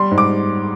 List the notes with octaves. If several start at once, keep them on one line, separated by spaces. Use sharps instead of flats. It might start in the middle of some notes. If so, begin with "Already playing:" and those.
Already playing: G3 C6
G#2
D6